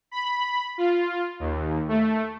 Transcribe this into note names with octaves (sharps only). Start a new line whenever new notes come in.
B5
F4
D#2
A3